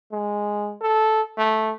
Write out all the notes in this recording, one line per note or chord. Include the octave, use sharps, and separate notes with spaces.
G#3
A4
A3